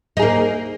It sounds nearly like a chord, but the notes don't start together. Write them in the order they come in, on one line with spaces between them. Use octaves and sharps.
D#4 G#4 A#3